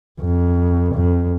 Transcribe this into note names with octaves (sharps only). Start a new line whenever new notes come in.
F2
F2